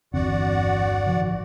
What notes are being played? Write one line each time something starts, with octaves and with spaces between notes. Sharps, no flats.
G1 E2 D3 C4 F#4 D5 F#5
A1 D#3 F3